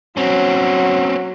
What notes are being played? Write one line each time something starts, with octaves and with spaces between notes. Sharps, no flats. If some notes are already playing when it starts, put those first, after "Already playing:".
F#3 C4 C#4